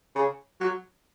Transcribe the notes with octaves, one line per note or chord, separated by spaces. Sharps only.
C#3
F#3